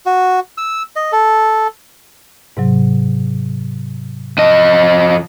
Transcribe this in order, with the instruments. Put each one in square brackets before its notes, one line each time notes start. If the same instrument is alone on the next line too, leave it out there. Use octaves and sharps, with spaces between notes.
[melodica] F#4
E6
D#5
A4
[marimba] G#2 C3 F#3
[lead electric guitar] F2 D#5 [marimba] A5